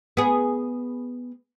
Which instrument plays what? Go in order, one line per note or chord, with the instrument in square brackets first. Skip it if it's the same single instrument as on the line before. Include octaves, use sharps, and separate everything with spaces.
[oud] B3 G#4